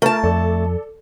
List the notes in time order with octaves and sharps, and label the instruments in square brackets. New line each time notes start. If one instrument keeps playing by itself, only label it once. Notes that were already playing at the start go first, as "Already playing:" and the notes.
[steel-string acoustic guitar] A3 A5 [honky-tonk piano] F4 A#4
[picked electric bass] F2 [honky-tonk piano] A4 D5